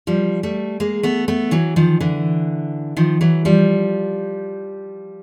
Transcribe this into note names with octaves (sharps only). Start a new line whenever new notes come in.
F3 G3
G3 A3
G#3 A#3
A3 B3
A3 B3
E3 F#3
D#3 F3
D3 E3
D#3 F3
E3 F#3
F3 G3